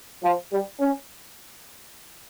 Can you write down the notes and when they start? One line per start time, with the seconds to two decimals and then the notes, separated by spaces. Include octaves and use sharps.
0.22 F3
0.50 G3
0.80 C#4